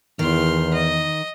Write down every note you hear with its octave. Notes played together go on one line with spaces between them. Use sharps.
E2 D#3 C6 F6
D#5